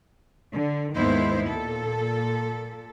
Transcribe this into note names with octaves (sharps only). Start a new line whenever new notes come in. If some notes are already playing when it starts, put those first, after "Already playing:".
D3
D#2 G#2 D#3 B3 E4 C5
A#2 A4